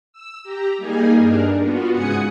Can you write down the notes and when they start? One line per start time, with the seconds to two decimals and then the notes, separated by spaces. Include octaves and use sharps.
0.13 E6
0.44 G4 A#5
0.78 G3 A#3 D#4 G#4 G#5
1.15 G2 D4 A#4
1.61 B3 F4 F#4
1.92 G#2 C#3 F#5 G#5 D#6 C#7